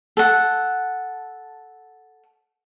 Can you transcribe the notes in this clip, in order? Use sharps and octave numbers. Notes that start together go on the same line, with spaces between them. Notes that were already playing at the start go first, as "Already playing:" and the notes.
A4 F#5